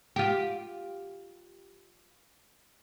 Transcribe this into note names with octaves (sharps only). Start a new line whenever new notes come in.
F4 G4